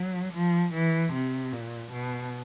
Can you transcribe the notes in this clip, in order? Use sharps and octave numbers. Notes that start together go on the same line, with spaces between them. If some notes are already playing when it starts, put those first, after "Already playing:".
Already playing: F#3
F3
E3
C3
A#2
B2